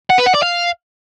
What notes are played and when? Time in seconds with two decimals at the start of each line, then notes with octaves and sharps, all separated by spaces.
0.10 F#5
0.18 B4
0.27 F#5
0.35 D5
0.43 F5